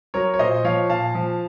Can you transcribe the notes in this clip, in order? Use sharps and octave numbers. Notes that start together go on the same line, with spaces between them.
F#3 A#4 C#5
C#5
A#2 C5 D#5
F3 C#5 F5
A#2 F5 A5
F3